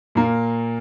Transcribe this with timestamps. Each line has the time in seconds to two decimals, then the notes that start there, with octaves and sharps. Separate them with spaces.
0.15 A#2 A#3